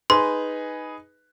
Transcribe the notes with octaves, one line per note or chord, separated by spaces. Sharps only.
D#4 G#4 B4 C6